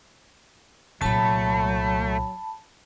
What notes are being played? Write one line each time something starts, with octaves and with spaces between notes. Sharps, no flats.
C2 A#2 F#3 A3 A5 B5